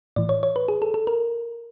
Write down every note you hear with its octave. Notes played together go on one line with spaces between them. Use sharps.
A2 E3 D5
C#5
C#5
B4
G#4
A4
A4
A#4